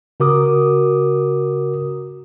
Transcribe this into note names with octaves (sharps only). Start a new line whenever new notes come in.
C#3 F#4 A#4 D6 D#6